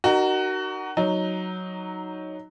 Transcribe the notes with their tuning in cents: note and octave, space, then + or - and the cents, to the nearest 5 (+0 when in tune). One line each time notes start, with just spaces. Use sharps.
D#4 -25 F#4 +20 A#4 +0
F#3 +0 D#4 +5